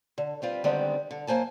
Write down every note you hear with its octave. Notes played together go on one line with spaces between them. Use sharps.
D3
G3 C4 F4 B4
D3 D#3 G3 G#3 B3 C4
D3
F#2 A#3 C5 G#5 A5